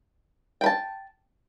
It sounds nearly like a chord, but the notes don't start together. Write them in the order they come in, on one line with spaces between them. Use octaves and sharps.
G5 B5 A5